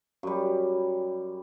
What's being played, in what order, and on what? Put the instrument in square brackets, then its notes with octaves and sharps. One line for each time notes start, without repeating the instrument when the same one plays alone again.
[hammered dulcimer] F#2 G3